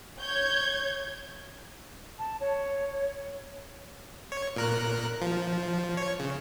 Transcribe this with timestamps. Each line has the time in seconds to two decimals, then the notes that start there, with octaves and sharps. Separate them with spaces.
0.19 C#5 G6 G#6
2.18 A5
2.40 C#5
4.32 C#5
4.56 A#2 A#4 F#6
5.21 F3
5.97 C#5
6.20 C#3